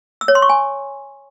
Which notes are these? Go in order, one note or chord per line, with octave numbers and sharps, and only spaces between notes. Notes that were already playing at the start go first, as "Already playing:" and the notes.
E6
C#5
C6
C#6
G#5